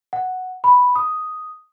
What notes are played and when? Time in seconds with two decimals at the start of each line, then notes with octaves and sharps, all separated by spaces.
0.13 F#5
0.64 B5
0.96 D#6